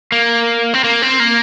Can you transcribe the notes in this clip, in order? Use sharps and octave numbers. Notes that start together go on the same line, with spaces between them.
A#3
C4
A#3
C4
A#3